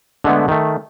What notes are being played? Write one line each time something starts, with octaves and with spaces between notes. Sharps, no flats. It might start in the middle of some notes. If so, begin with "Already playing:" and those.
D3 G#3 A3 B3
D#3 A3